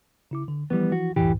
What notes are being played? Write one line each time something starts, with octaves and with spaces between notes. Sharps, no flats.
C#3 E4 D6
D3
E3 F3 G3 B3 E4
F#4
C#2 F#2 A2 E3 G4